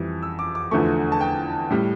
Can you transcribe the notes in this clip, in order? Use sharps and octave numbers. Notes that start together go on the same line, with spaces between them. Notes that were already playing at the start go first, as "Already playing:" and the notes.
Already playing: F2 E3 G3
E6
D6
D6
E2 D3 F3 A3 C#6
A5
G5
A2 G3